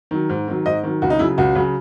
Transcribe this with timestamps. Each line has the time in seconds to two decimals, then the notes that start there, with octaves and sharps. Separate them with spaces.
0.11 D#3 F#3
0.29 G#2
0.48 D#3 F#3
0.66 G#2 D#5
0.84 D#3 F#3
1.02 C#2 F#4
1.10 D#4
1.19 C#3 F#3 E4
1.38 C#2 F#4
1.55 C#3 F#3